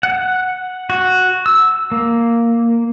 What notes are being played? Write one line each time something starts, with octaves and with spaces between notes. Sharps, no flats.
F#5
F#4
E6
A#3